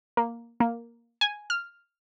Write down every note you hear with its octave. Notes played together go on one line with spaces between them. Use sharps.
A#3
A#3
G#5
F6